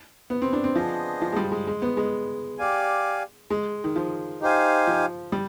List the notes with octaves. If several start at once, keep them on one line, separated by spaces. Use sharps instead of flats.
B3
C4
D4
C4
F3 B3 D4 G#4 C5 D#5
F3
G#3
G3
G#3
G#3
B3
G#3
G4 D5 F5 G#5
G#3
D#3
F3
D#4 G4 C5 F5 G#5
F3
G3